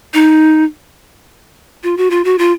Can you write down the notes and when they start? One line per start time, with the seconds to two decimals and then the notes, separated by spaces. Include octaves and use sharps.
0.14 D#4
1.83 F4
1.97 F#4
2.10 F4
2.25 F#4
2.38 F4